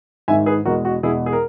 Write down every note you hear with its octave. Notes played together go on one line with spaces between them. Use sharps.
G#2 D#3 G#3 E5 G#5
G#4 B4
E2 B2 G#3 F#4 A#4
F#4
E2 B2 G#3 E4 G#4
G#4
A#4